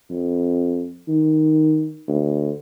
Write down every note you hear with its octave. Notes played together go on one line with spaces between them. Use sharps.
F2
D#3
D2